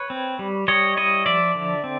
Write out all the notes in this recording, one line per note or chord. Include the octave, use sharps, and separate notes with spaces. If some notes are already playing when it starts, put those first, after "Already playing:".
Already playing: B4 C#5
C4
G3
G3 C#5 D#5
E4 C#5 D#5
F3 D5 E5
D3
C4